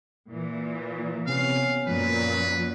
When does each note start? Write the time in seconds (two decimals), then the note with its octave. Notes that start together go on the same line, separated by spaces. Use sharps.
0.30 A#2 E3
1.26 C3 B3 C#4 F5
1.87 F#2 A#2 F3 B4